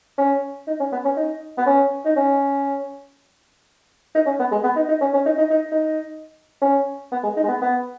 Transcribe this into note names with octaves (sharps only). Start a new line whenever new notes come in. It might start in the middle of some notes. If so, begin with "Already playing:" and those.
C#4
D#4
C#4
B3
C#4
D#4
B3
C#4
D#4
C#4
D#4
C#4
B3
G#3
B3
D#4
D#4
C#4
C#4
D#4
D#4
D#4
D#4
C#4
B3
G#3
D#4
G#3
B3
B3